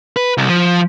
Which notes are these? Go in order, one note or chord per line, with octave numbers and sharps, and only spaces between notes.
B4
C2
F3